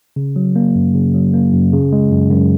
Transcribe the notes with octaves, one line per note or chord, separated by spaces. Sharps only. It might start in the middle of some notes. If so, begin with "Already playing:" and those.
C#3
F#3
A#3
F#2
C#3
F#3
A#3
F#2
C#3
G#3
F#2
F#2